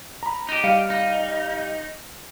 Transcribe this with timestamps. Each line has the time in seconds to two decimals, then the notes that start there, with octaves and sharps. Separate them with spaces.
0.23 A#5 B5
0.49 D#4 G4
0.64 G3 F5 C#7
0.90 D#4